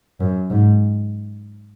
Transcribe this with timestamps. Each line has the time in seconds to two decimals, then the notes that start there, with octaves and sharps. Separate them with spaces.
0.20 F#2
0.50 G#2